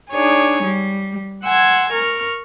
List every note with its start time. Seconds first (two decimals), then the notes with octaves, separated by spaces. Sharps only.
0.10 D4 D#4 G#4 C#5
0.62 G3
1.43 F#5 G#5 C6 E6 G#6
1.92 A#4 C#6 F6